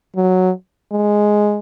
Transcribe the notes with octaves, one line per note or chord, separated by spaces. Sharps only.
F#3
G#3